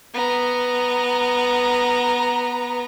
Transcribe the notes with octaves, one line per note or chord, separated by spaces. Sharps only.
B3 A#5